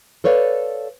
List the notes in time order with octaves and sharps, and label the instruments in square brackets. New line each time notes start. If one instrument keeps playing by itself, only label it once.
[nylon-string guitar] A4 B4 C#5 D5 F5